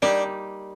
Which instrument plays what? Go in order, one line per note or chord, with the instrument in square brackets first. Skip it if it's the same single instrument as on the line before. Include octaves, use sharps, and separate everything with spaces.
[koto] G3 A#3 D#4 G4 [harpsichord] D4